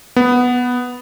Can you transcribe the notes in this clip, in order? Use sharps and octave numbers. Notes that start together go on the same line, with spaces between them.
B3